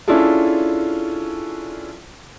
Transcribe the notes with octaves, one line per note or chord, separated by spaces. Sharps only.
C#4 D4 E4 F4 G#4 A4